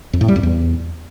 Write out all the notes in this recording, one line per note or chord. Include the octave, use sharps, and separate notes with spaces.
F2
A2
G3
F2
E2